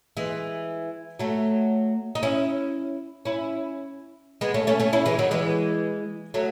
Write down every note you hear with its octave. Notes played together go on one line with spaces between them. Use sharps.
E3 G#3
F#3 A3
D#4
C#4 E4
C#4 E4
G#3 B3
A3 C#4
A3 C#4
A3 C#4
C#4 E4
E3 G#3
D#3 F#3
E3 G#3
F#3 A3